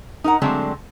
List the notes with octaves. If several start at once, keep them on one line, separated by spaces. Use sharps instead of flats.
D#4 A#4 F#5
D3 F#3 G#3 A3 C4 D4